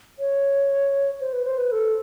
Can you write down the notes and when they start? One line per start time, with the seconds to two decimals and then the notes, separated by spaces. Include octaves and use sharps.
0.19 C#5
1.21 C5
1.33 B4
1.45 C5
1.58 B4
1.72 A4